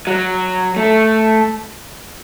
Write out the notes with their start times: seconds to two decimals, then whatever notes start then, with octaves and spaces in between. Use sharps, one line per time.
0.07 F#3
0.76 A3